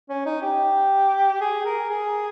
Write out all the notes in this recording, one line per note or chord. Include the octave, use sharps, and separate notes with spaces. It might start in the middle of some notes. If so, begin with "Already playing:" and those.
C#4
D#4
G4
G#4
A#4
G#4